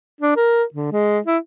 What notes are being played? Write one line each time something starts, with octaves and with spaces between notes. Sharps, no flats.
D4
A#4
D3
G#3
E4